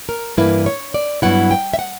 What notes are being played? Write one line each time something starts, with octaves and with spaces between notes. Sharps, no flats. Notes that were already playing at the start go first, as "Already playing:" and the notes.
A#4
G2 E3 A#3 E4 B4
C#5
D5
G2 F#3 B3 E4 F#5
G5
E5
F#5